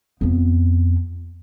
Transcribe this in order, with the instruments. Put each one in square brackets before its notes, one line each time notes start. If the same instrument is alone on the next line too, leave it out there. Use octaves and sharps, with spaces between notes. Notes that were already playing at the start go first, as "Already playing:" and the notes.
[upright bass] F2 B3